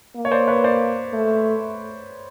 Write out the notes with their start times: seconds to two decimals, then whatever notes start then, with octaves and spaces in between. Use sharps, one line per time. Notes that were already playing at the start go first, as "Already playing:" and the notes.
0.15 A#3
0.25 C#5
0.31 C5 D5
0.48 B4 C#5
0.64 C5 D5
1.13 A3